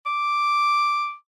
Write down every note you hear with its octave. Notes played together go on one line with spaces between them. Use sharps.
D6